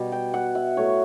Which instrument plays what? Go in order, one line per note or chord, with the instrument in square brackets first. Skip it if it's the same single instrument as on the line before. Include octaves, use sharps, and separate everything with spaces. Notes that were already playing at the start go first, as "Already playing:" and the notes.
Already playing: [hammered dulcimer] B2 G3
G5
F#5
E5
A2 F#3 A3 C#5